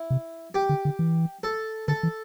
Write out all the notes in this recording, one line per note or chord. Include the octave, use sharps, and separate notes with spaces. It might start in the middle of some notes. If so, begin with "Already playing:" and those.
Already playing: E4
C3
G4
D3
D3
E3
A4
D3 A4
E3